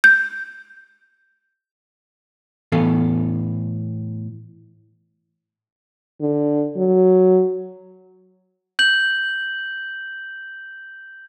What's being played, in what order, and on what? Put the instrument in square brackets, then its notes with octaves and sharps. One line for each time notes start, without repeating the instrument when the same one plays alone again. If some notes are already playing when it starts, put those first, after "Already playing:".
[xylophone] G6
[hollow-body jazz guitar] A2 E3 B3 A4 F5
[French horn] D3
F#3
[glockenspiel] G6 F#7